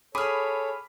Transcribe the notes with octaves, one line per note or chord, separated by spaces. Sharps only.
G#4 A4 C#5 B5 D6 F6